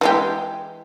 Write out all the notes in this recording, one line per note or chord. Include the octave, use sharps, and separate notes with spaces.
E3 G#3 G4